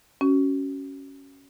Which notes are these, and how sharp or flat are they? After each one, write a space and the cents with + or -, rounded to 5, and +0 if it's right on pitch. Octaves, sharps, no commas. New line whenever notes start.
C#4 +0 F#4 +30